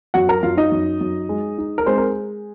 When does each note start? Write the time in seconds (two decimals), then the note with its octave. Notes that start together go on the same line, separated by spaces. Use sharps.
0.14 F#2 F#4 F#5
0.29 A#4 A#5
0.43 F#2 F4 F5
0.57 D#4 D#5
0.72 F#2
1.01 F#2
1.29 G#3
1.58 D#4
1.78 A#4
1.86 G#3 C4 C5
1.98 A#4